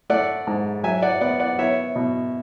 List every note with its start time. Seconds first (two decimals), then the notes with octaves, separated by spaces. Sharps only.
0.10 A3 D5 F#5
0.47 G#2
0.84 F#3 E5 G#5
1.03 D5 F#5
1.21 B3 D5 F#5
1.40 D5 F#5
1.58 B3 C#5 E5
1.96 B2